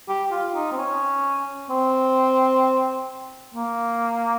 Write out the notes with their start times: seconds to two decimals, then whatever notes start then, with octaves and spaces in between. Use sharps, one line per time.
0.08 G4
0.32 F4
0.55 D#4
0.72 C4
0.78 C#4
1.70 C4
3.55 A#3